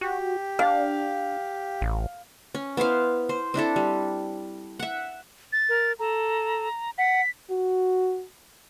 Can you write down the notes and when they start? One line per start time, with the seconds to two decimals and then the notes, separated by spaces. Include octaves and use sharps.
0.01 F#4 G4
0.59 D4 F5
1.81 A1
2.55 C#4
2.77 B3 E4 C5 F5
3.29 C5
3.54 C4 D4 E4 A4
3.76 G3
4.79 E5 F#5
5.53 A6
5.69 A#4
5.99 A4 A#5
6.98 F#5 B6
7.50 F#4